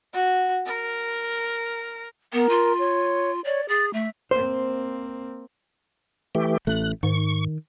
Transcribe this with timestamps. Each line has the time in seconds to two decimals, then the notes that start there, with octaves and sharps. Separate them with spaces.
0.14 F#4
0.66 A#4
2.33 B3 A#4
2.49 F4
2.78 C#5
3.45 C#5 D5
3.69 G#4 A6
3.93 A3 E5
4.31 A#3 C4 C5
6.35 E3 A3 G4
6.67 A1 A3 F#6
7.03 G#2 D#3 C#6